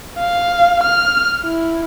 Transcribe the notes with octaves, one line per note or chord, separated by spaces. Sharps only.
F5
F6
E4